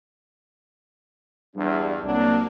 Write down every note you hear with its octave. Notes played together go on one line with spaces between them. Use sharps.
E2 G2 G3 D4
C2 F#3 A#3 D4